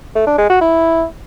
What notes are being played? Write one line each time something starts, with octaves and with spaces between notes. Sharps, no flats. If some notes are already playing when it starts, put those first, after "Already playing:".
A3
D4
G#3
F#4
E4